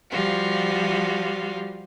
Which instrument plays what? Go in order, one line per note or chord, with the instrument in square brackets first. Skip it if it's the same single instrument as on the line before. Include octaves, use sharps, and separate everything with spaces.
[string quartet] F3 G3 F4 F#4